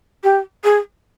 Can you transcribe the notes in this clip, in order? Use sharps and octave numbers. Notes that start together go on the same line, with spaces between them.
G4
G#4